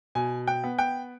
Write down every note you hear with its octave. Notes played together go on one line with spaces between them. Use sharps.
B2 G#5
G5
B3
G5